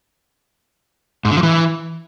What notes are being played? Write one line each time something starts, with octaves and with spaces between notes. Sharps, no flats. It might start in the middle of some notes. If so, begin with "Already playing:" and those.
G#2
D3
F3
E3